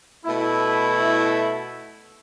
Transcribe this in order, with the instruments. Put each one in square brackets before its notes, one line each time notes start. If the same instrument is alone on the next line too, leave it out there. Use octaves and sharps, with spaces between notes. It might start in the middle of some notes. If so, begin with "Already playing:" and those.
[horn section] B2 A3 E4